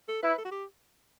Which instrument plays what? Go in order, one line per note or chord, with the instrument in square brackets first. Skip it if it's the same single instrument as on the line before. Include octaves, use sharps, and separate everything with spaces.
[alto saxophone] A4
[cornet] E4 [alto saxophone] B4
[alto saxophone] A4
F#4
G4